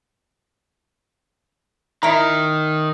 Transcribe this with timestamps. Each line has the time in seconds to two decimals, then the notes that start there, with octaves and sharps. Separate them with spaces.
2.03 D#3 E4 A#5